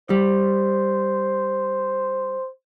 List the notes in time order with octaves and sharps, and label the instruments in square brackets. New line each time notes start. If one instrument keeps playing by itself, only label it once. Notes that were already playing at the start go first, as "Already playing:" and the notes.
[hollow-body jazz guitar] G3 [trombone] C5